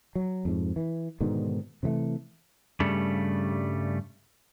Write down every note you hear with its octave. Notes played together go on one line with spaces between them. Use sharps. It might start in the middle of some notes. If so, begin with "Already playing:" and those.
F#3
F2 G#2
E3
G#2 B2 D3 D#3
C3 E3 F#3 A3
G2 C#3 G3 A3